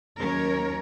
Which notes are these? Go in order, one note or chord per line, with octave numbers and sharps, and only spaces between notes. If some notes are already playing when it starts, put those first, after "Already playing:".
D#2 F#3 C#4 A#4 C#5